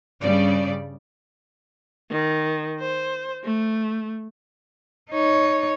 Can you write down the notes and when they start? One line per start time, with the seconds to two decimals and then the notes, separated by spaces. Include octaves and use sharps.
0.21 G2 C#3 G3 D5
2.11 D#3
2.80 C5
3.44 A3
5.10 D#4 C#5